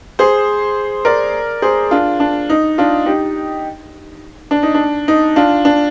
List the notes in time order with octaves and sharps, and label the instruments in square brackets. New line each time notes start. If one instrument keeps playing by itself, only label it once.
[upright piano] G#4 C5
A#4 D5
G#4 C5
D4 F4
D4
D#4
D4 F4
D#4 G4
D4
D#4
D4
D#4
D4 F4
D4